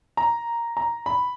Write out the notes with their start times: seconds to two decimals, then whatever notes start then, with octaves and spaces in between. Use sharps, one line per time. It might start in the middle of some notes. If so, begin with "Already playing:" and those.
0.17 A#5
0.77 A#5
1.06 B5